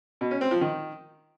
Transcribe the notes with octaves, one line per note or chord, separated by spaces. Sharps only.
B2
C#4
C4
F3
D#3